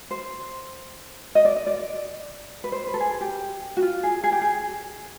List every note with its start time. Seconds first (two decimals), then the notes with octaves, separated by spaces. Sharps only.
0.11 C5
1.35 D#5
1.45 D5
1.56 D#5
1.67 D5
1.77 D5
2.64 B4
2.72 C5
2.87 B4
2.94 A4
3.00 G#4
3.21 G4
3.77 F#4
3.82 F4
4.03 G#4
4.24 G#4
4.32 G4
4.42 G#4